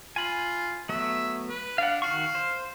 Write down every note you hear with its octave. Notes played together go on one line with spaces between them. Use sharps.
F4 G#5 B5
F#3 A3 B3 E5
B4
D4 F5 F#5
D#3 F#4 F5 C#6
C5